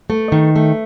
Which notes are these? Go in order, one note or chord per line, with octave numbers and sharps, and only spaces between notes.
A3
D#3
A3